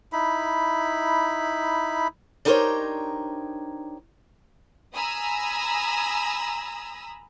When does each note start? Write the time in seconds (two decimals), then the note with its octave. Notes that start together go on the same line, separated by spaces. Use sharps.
0.13 D#4 E4 B5
2.45 D4 D#4 G4 A#4 C5 C#5
4.96 G#5 A#5 B5 D#6 E6